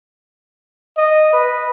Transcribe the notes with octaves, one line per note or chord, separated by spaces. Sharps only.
D#5
B4